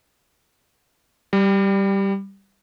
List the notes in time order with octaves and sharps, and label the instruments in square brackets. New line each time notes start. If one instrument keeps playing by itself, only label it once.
[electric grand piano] G3